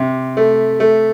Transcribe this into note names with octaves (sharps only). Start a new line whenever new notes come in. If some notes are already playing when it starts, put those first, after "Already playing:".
Already playing: C3
A3
A3